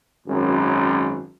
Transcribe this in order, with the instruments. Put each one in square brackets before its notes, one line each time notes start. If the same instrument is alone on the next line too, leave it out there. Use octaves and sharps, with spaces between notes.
[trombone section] G#1 F#2